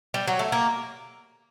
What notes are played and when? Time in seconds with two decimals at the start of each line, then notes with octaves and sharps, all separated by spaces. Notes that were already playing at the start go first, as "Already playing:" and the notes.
0.14 G3
0.27 F#3
0.39 A3
0.52 A#3